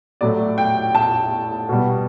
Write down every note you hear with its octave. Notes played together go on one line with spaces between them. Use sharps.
A2 F#3 A3 D5
G5
A5
B2 G3